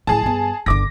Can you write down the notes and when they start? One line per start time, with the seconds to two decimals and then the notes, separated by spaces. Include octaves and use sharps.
0.07 A2 E3 G#4 A5
0.23 G2 B3
0.66 G1 D3 D6 A#6